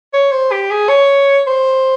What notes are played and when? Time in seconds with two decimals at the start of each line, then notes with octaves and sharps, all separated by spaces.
0.13 C#5
0.32 C5
0.52 G4
0.70 G#4
0.89 C#5
1.47 C5